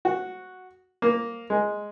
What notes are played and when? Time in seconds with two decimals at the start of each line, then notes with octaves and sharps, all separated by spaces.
0.05 F#4
1.02 A#3
1.50 G#3